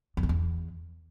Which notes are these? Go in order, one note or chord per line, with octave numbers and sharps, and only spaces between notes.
F2
G#2
E2